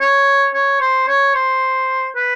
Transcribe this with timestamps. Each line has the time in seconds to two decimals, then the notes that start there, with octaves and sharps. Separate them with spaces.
0.01 C#5
0.54 C#5
0.81 C5
1.08 C#5
1.35 C5
2.16 B4